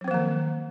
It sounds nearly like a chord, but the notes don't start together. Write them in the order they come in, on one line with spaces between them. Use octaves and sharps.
F#3 C4 F3 A#3 D#3